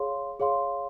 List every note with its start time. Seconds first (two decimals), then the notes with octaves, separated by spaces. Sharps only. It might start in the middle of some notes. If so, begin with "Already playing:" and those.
Already playing: G#4 C#5 F5 C6
0.40 G#4 C#5 F5 C6